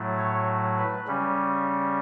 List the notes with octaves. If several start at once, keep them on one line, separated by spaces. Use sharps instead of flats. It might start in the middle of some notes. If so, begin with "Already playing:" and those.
Already playing: A2 F#3 A3
C#5
B4
C#3 G3 C#4